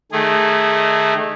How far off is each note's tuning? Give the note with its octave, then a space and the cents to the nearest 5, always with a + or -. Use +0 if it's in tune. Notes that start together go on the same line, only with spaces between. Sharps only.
D#3 -20 A3 -15 G#4 -15